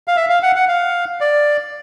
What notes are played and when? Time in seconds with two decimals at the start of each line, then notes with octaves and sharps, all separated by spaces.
0.08 F5
0.16 E5
0.30 F5
0.43 F#5
0.56 F#5
0.68 F5
1.21 D5